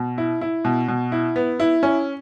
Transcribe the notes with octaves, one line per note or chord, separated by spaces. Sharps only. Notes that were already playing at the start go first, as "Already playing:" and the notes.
Already playing: B2
E4
E4
B2
B2
E4
B3
E4
C#4